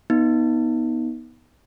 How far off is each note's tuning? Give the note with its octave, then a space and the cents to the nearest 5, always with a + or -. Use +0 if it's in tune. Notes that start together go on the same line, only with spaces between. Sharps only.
B3 -15 D#4 +20